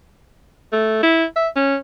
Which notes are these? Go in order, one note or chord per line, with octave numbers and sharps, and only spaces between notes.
A3
E4
E5
C#4